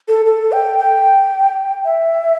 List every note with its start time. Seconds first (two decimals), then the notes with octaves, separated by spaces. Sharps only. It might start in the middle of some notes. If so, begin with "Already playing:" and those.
0.08 A4
0.26 A4
0.52 G5
0.78 G5
1.85 E5